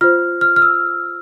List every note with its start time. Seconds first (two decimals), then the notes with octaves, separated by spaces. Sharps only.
0.01 F4 C5 F6
0.41 F6
0.56 F6
0.62 E6